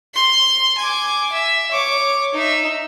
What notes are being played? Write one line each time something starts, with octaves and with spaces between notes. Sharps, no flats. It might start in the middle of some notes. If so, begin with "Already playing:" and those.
C6
G#5 D6
E5
C#5 D6
D#4 E5